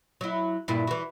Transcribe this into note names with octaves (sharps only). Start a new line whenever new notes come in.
F#3 E4
G2 A#2 E4
E3 F#4